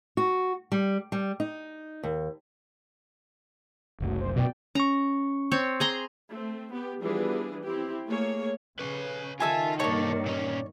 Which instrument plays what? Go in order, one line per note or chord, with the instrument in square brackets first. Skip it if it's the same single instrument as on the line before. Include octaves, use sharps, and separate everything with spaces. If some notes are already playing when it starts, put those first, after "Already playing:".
[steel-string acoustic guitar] F#4
G3
G3
D#4
D#2
[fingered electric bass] F#1 C2 F#2 [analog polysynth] F#3 A3
[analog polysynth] C5
[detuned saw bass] B2 [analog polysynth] D5 G5
[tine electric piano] C#4 C#6 [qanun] A#5
[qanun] C4 C#5
G#4 A#5 C6
[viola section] A3 C4
B3 G4
E3 F3 G3 B3 D4 G#4
C4 E4 G4
A3 A#3 G#4 C#5
[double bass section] C#3 C#4 [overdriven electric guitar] B4 C#5
[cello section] D#3 [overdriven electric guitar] F4 [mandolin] A4 E5 G#5
[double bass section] G2 A#3 [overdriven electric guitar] B2 A4 [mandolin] C#5 D5
[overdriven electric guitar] A#2 C#4